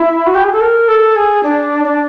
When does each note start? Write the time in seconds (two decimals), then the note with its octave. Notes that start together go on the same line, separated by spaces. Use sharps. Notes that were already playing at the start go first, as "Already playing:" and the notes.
Already playing: E4
0.26 F#4
0.35 G4
0.43 G#4
0.52 A4
0.61 A#4
0.88 A4
1.16 G#4
1.43 D4
1.84 D4